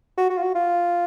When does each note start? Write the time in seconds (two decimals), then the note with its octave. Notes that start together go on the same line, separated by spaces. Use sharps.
0.17 F#4
0.30 F#4
0.37 F4
0.43 F#4
0.55 F4